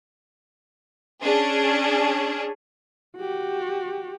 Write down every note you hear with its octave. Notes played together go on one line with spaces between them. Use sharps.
C#4 D4 G#4
F#4 G4